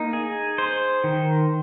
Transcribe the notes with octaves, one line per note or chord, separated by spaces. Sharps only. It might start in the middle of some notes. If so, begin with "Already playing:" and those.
Already playing: A#3 D#4
G#4
C5
D#3